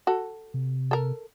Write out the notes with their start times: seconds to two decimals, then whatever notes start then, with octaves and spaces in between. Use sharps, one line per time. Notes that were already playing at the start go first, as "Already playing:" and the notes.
0.07 F#4 A4
0.54 C3
0.91 A4 A#4